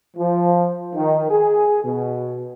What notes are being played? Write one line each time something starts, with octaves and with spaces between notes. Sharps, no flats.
F3
D#3
G#4
B2